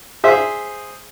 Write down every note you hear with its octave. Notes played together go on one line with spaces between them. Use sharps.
G#4 C5 E5